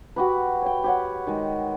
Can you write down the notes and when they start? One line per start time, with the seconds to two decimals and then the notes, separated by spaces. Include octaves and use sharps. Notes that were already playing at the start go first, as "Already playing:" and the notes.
0.16 F#4 G4 B4
0.62 C#5 G5
0.84 G4 C#5 F#5
1.27 D#3 G#3